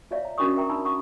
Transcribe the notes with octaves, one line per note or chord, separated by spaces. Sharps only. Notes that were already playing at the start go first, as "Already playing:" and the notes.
F4 C#5 D5 E5 F5
A#5
C#4 D4 F#4 A#4 C#6 D#6
A#4 E5 G5 A#5
D4 D#4 A#5 B5 E6
F#5 C#6 D#6